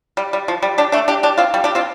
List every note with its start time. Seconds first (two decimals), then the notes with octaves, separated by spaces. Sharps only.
0.17 G3
0.33 G3
0.48 F3
0.62 G3
0.78 D4 G4
0.92 A3 D4
1.08 D4 G4
1.23 D4 G4
1.38 C4 F4
1.54 G3
1.64 D4 G4
1.75 C4 F4